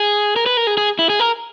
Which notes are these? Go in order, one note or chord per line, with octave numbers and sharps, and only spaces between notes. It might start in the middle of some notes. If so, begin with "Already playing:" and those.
Already playing: G#4
A#4
B4
A#4
G#4
G#4
E4
G#4
A#4